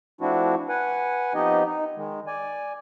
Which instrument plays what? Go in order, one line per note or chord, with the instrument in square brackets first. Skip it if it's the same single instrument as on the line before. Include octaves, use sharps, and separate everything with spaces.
[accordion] F3 A3 C4 D4 E4 F#4
B4 F#5 G#5
F3 B3 C4 D#4 G4 D#5
D#4
D#3 G#3
D5 G#5